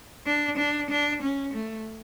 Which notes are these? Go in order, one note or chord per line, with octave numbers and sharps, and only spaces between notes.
D4
D4
D4
C#4
A3